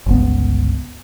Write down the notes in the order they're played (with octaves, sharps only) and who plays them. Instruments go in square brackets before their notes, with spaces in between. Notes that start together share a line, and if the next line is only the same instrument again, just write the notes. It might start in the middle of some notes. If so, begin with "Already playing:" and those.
[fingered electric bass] G1 C#2 B3